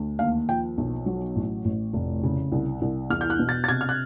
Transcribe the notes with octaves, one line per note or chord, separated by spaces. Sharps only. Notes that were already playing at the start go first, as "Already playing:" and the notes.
Already playing: D2
D#2 F5
F3 G5
B1
F#3
A1
A1
F1
C#3
C2
C2
E2 F6
G6
F#6
B2
A6
A6
C3 G#6
F6
F#6